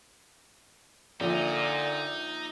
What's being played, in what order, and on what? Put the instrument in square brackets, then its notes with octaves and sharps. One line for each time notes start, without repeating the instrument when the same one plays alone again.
[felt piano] A#1 [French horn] A#2 [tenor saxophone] D3 [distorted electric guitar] D#4